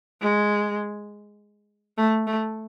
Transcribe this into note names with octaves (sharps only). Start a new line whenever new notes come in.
G#3
A3
A3